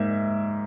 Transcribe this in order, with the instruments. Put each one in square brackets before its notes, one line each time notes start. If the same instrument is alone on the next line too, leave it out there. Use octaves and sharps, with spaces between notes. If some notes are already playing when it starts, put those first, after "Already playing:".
Already playing: [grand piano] G#2 A#3 E5